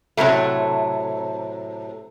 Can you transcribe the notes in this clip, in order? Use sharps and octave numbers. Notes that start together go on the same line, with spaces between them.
A2 C3 F#3 G3 A3